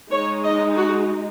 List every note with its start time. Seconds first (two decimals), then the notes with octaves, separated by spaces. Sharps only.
0.11 G#3 D#4 C#5
0.44 D#5
0.76 F#4